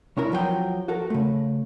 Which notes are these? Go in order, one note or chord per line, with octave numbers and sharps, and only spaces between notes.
C2 C#4 E4 A#4
F3 F#3 G#4 G5
F#4 A4 A#4
C#3 A3